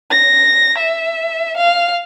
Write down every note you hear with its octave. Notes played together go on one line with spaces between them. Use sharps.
A#6
E5
F5